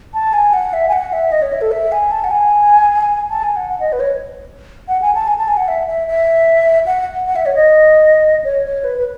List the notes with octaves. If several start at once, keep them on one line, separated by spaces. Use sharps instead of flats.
A5
G#5
F#5
E5
G#5
F#5
E5
D#5
C#5
E5
A4
E5
G#5
A5
F#5
G#5
A5
G#5
F#5
F#5
D#5
B4
C#5
F#5
G#5
A5
G#5
A5
G#5
F#5
E5
E5
E5
F#5
F#5
E5
C#5
D#5
C#5
C#5
B4
B4